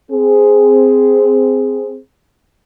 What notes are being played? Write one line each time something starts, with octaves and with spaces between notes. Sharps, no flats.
C4 G#4